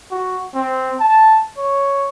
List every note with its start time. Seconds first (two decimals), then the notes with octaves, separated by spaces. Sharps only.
0.11 F#4
0.54 C4
1.00 A5
1.58 C#5